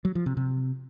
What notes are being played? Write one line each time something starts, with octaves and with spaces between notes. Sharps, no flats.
F#3
F3
C3
C3